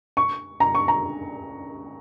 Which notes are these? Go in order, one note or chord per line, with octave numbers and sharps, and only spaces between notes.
C#6
A#5
C#6
A#5